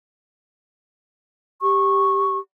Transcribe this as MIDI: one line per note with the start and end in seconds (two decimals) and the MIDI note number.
1.62 2.39 67
1.62 2.37 85